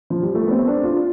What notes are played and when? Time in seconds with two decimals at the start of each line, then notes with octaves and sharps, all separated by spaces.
0.10 F3
0.23 G3
0.35 A3
0.47 B3
0.51 C4
0.68 D4
0.83 F4